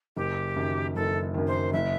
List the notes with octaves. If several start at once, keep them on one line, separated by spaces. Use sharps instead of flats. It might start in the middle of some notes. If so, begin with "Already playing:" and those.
F#1 G4
F#2 D#3
F#1 A4
F#2 D#3
C5
F#1 E5